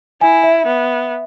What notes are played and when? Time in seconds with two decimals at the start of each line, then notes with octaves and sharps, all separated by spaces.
0.21 E4 G#5
0.44 E5
0.66 B3